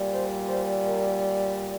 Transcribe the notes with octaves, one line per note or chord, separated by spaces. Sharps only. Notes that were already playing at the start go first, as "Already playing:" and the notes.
Already playing: A#2 G3
C5
C5
A#4